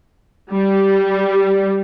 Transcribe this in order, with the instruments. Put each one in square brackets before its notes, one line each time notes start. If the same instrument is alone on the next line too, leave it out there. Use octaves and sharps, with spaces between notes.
[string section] G3